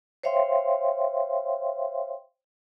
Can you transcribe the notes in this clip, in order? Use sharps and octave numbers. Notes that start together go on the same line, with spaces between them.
C5 C#5 E5 F5 G5 C6